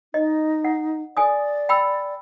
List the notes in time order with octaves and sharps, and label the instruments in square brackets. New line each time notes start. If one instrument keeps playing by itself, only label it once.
[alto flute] D#4 [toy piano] D#5
[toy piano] F#5
[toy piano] A4 G#5 D#6 [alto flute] D5
[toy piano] G5 B5 E6